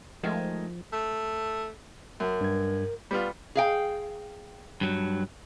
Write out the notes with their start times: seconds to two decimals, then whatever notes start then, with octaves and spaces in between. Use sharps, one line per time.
0.23 D#3 F3 G#3 A3
0.93 A3
2.20 F#2 A#4
2.41 G2 G#6
3.11 G3 B3 F4 B5
3.55 G#4 F5 G5
4.81 G2 F#3